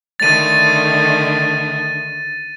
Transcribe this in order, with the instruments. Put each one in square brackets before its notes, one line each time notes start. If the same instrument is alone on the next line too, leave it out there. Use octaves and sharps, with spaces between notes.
[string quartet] D3 D#3 A3 [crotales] A6 D#7